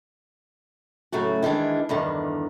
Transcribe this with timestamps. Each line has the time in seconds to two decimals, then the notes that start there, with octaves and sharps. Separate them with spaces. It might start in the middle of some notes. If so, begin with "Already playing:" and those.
1.12 A2 C#3 F#3 A3 F#4
1.43 D#3 E3 G#3 D4
1.89 E2 G2 D3 D#3